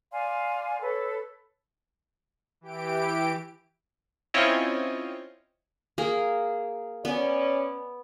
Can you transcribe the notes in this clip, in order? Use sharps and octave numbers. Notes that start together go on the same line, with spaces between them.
D5 F5 G#5 C6
A4 B4 C#5
E3 G4 D7
C4 C#4 E4 F4 C#5 D#5
A#3 G#4
B3 C#4 D5